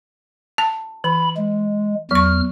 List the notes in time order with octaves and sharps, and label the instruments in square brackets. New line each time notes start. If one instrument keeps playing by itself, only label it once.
[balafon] A5
[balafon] E3 [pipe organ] B5
[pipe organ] G#3
[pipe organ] E2 F6 [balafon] F#3 C#6